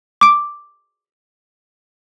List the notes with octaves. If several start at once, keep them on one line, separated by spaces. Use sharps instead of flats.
D6 D7